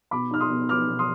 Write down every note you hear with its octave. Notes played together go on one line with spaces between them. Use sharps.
B2 B5 D6
D#4 F6
C6 D#6
B2
B3 D6 F6
B2
C6 D#6